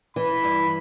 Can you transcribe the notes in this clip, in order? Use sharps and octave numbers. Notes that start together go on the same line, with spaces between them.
E3 B5
G2